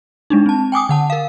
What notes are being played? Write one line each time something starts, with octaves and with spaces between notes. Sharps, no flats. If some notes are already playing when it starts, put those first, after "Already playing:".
G#3 D4 D#4
C4 A5
G5 G#5 D6 D#6
D3 F#5 A5
A#4 F5